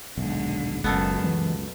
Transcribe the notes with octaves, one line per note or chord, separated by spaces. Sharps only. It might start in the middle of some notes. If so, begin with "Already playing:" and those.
D#1 B1 D3 G#3
F#1 C#2 F#2 B2 A3 B3
E3